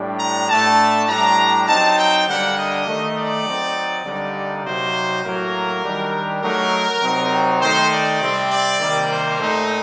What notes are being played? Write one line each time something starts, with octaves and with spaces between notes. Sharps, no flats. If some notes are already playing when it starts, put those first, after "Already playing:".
Already playing: A2 G3 D4
A#5
A2 A3 D4 A5
A2 G3 D4 A#5
F#3 C4 D#4 A5
G5
D3 G3 A#3 D4 F#5
D#5
D#3 A3 D#4
D5
F#3 C4 D#4
D3 G3 A#3 D#4 D5
C3 F#3 A#3 D#4 C5
A2 F#3 A#3 A#4
D#3 G3 D4
F#3 A3 D#4 A#4
C3 F#3 C4 D#4
D#3 A3 D#4 C5
D5
C3 G3 C4
D5
C3 D#3 G3 A#3
C5
A#2 A3 C4 D#4